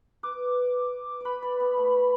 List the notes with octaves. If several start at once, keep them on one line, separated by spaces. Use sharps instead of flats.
B4 D6
B4 D5 B5
D5
B3
A3